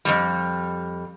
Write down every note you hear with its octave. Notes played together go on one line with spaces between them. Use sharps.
F2 C3 G3